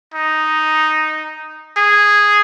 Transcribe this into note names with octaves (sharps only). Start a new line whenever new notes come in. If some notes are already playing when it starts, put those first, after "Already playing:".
D#4
G#4